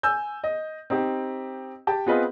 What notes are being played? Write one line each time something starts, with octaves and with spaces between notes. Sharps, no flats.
G#5 E6 G6
D#5
C4 D#4 G4
G4 G5 A5
B3 C4 F4 G#4 B4 D#5